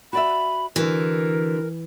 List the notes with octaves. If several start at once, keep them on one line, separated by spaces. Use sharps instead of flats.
F#4 D5 E5 B5
D3 E3 F#4 A#4